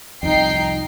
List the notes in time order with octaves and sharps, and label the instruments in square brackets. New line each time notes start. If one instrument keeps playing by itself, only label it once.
[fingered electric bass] C2 F2 [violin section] D#4 G5 C7